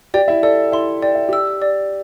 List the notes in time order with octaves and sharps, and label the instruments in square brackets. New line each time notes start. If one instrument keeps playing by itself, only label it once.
[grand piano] G4 G5 [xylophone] D5
[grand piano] E4 E5
[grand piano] A4 [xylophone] D5
[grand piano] E4 E5 [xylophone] C6
[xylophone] D5 [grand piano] G5
[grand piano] E5
[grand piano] G4 G5 [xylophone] E6
[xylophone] D5